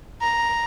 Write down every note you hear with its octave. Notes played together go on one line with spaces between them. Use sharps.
A#5